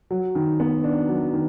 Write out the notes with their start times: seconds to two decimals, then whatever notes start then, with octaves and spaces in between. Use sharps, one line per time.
0.11 F#3
0.35 D#3
0.60 B3
0.84 D4
1.09 F#3
1.33 D#3